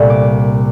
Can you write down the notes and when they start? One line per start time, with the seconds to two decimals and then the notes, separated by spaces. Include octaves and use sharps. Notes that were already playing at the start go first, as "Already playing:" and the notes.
Already playing: C2 A#2 A3 C4
0.10 D6